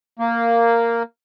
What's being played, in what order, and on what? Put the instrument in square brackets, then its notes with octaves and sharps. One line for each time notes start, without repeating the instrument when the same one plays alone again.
[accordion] A#3